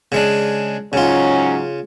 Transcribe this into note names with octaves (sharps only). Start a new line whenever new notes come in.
C#3 G#3 D4
G#2 C#3 F#3 C#4 F4